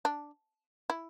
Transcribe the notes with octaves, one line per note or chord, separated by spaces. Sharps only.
D4
E4